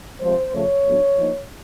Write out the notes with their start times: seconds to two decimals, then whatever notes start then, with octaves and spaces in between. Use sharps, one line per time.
0.21 C3 F3 G#3 C5
0.53 C#3 F3 A3 C#5
0.85 A2 F#3 B3 D4
1.17 F3 A#3 D#4